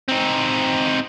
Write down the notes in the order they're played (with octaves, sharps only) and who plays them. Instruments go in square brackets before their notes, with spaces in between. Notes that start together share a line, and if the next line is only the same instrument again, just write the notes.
[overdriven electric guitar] C4 D#4